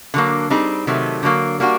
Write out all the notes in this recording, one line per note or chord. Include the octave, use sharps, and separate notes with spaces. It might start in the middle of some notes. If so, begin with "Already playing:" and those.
D3 F#3 A#3
G3 C4 D#4 G#4
C3 D#3 F#3 A3
D3 F#3 A#3
G3 A#3 D4 F#4